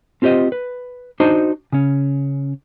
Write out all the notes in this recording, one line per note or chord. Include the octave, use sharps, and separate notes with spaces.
C4 F4 G4 C5 D#5
B4
D4 D#4 F#4 C5 D#5
C#3 C#4